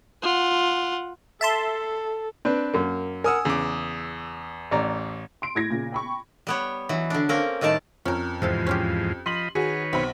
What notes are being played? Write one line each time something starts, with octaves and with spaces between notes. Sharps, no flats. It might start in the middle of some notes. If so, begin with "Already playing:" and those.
F4 F#5
A4 E5 A5 C6
C4 D4 B4
F#2 A#3
A#4 F#5 G#5 D#6 E6
E2 C#3 D6
A1 D5 A#5
C6 D7
A2 G#6 A#6
A#2 C#3
G5 B5 C#6
G3 B3 C#5
E3 F#3
D3 D4
A#3 C4 C#4 A#4
A2 D#3 G3 D5 A5
F2 C#4 A#4
E2 G#2 C3 F3 A4 A5
C#4 F4 G4
F3 D#5 B5 C6 F#7
D#3 F#4 G#4 B4 C#5
B1 C4 B5